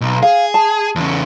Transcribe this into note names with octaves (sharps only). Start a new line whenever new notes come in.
B1
G#4 F5
A5
E2 C#3